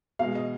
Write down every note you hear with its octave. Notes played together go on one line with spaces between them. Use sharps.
B2 G#3 F5
D#5